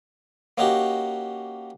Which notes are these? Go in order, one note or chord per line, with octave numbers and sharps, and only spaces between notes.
A#3 C#4 D#4 F#4 G4